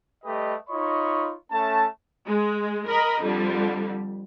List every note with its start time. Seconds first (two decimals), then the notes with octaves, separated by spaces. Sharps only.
0.24 G3 A3 G4 B4 D#5
0.70 D#4 F4 C#5 D#5 B5 C#6
1.51 A3 C#4 A5
2.26 G#3
2.87 A#4 D#5 B5
3.23 F2 D3 G3